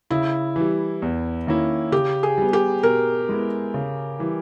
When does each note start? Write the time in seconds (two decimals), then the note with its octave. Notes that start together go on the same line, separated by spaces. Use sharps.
0.11 C#3 E4
0.56 E3 G3
1.02 E2
1.47 D#3 A#3 C#4 E4
1.92 C#3 G4
2.23 G#4
2.38 G3 B3
2.53 G4
2.83 B2 A#4
3.29 G#3 B3 E4
3.74 C#3
4.19 E3 G3